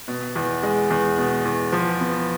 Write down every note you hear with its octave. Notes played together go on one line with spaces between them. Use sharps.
B2
E2
G#3
E2
B2
E2
F3
B3